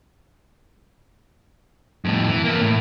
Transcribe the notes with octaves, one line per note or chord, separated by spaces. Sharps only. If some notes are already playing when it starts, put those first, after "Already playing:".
F2 A2
E3
A#3 E4
A2